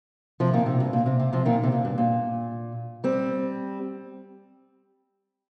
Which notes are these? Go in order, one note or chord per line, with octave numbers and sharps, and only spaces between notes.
C3 F3
A#2 D#3
C3
G2
A#2
C3
C3
C3 F3
A#2 D#3
C3
A#2
G2
A#2
G3 C4